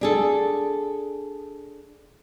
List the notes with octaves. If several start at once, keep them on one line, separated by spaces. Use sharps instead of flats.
D4 G#4 A4